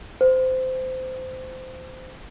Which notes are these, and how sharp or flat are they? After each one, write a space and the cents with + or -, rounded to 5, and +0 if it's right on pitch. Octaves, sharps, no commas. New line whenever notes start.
C5 -20